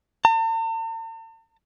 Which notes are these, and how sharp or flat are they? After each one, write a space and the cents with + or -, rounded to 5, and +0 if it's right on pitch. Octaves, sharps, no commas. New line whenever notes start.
A5 +45